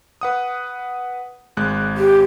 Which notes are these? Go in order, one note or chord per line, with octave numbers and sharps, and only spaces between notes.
B4 F#5 D#6
G#1 G#3 F#6
G4